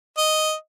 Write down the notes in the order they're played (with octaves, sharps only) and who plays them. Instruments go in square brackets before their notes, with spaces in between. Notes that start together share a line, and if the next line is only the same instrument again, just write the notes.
[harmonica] D#5